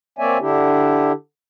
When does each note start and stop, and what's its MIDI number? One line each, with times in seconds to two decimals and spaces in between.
0.19 0.38 58
0.19 0.38 60
0.19 0.38 73
0.19 0.38 74
0.19 0.38 76
0.19 0.38 80
0.40 1.12 50
0.40 1.12 62
0.40 1.12 64
0.40 1.12 67